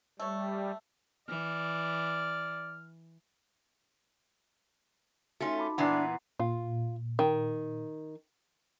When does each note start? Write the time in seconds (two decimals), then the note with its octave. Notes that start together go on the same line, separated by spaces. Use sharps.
0.20 G3 A3 C#5
1.29 E3 D5 F6
5.40 A3 C#4 D#4 F4 F#4
5.58 A5 B5 D6
5.78 A#2 E3 B3 D4 F#5 A#5 C7
6.40 A#2 F4
7.19 D#3